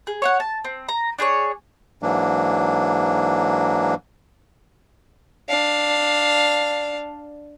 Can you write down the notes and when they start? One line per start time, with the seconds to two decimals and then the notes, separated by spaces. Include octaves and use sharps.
0.07 G#4
0.22 C#5 F5 F#5
0.40 A5
0.65 C4
0.89 A#5
1.19 D4 G#4 B4 C#5
2.03 G#2 E3 F#3 A#3 D4
5.49 D4 F5